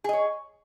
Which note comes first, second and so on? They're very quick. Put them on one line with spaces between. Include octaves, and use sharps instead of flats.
G#4 D#5 C#5